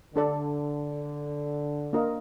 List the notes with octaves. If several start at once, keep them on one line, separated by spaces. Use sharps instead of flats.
D3 D4 A4 D5
A#3 D4 F4 A#4 D#5